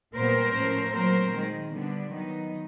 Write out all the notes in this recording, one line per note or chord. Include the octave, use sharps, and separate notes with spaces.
A#2 G3 B3 A#4 C5
A2 F3 A3 C#4
A#2 F#3 A3 C4 A#4 C5
D#3 G#3 C4
D3 G3 B3 D4
D#3 F#3 B3 D#4